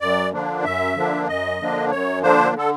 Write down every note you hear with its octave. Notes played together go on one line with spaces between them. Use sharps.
F#2 D5
D3 F3 A#3 D4
F#2 E5
D3 F3 A#3 D4
F#2 D#5
D3 F3 A#3 D4
F#2 C#5
D3 F3 A#3 D4 C5
D3 A4